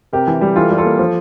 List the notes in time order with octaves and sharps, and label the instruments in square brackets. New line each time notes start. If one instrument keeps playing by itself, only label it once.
[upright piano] C3 G4 A#4
E3
G3
E3 F4 A4
G3
F4 A4
A#3
F3